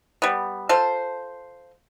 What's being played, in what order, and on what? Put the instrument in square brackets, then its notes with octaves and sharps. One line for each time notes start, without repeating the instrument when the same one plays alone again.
[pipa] G3 B3
F4 A4 C5